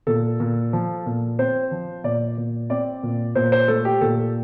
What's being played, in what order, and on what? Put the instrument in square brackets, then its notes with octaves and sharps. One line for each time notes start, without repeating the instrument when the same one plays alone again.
[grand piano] A#2 A4
A#2
F3
A#2
C4 C5
F3
A#2 D5
A#2
C4 D5
A#2
A#2 C5
C5
A3 A4
G4
A#2 A4